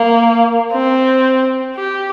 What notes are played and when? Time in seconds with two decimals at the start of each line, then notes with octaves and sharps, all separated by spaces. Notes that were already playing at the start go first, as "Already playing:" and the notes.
Already playing: A#3
0.72 C4
1.76 G4